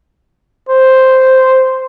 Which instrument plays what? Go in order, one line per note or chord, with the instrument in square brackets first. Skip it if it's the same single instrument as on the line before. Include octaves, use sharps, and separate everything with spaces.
[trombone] C5